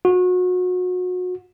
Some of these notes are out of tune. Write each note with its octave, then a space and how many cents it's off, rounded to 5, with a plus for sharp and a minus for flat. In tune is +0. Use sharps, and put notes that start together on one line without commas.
F#4 -30